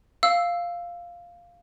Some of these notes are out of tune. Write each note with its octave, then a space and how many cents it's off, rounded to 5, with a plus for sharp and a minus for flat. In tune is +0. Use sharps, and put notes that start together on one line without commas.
F5 +0 E6 +0